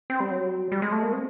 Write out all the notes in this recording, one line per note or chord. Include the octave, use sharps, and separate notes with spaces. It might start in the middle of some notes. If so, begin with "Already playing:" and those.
C4
G3
F#3
G3
G#3
A3
A#3
C4